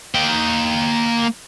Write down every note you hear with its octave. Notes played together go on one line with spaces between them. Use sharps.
A#3 G5